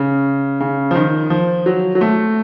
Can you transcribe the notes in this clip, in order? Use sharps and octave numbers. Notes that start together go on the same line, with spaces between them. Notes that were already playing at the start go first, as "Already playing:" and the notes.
Already playing: C#3
C#3
F3
D#3
F3
F#3
F#3
A3